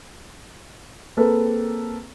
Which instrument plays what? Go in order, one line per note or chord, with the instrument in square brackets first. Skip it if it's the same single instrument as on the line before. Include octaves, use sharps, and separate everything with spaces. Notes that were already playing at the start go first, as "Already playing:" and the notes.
[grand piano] A#3 C4 G#4 A4 B4